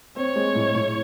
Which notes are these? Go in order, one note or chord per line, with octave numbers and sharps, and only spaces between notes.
C4 C#5
G#3
A2
A2